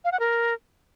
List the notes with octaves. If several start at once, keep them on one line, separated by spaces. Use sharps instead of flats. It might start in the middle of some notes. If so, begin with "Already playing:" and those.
F5
F#5
A#4